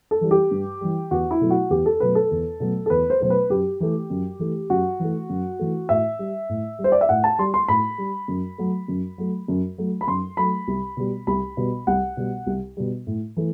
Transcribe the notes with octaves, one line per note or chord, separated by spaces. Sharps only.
A4
E3 G3
G4
G2
E3 G3
E2 F#4
E4
B2 F#3 A3
F#4
E2 G4
A4
B2 F#3 A3 B4
A4
E2
B2 F#3 A3
A4
E2 B4
C5
B2 F#3 A3 C5
B4
F#2 G4
E3 A3
F#2
E3 A3
F#2 F#4
E3 A3
F#2
E3 A3
A2 E5
G3
A2
G3
C5
D5
E5
A2 F#5
A5
G3 C6
C6
A2 B5
G3
F#2
F#3 A3
F#2
F#3 A3
F#2
F#3 A3
B5
F#2 C6
F#3 A3 B5
C2
B2 G3
C2 B5
B2 G3
C2 F#5
B2 G3
C2
B2 G3
A2
E3 A3